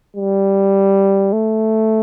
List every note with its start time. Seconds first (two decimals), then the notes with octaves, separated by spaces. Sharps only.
0.16 G3
1.33 A3